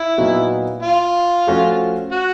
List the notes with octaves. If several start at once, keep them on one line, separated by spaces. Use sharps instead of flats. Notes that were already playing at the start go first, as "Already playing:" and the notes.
Already playing: E4
A#2 F#3 B3 D#4 F#4
F4
F3 A3 C#4 F#4
F#4